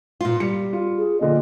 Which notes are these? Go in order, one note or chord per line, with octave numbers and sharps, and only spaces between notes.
A#2 F4
G3 C#7
F4
G#4
A#2 D3 F3 D#5